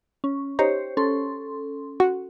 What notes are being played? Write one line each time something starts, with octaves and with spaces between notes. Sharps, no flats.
C#4
D#4 G4 C5 C#5
C#4 A4 C6
F#4